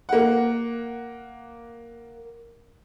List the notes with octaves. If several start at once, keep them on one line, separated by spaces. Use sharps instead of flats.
A#3 F#5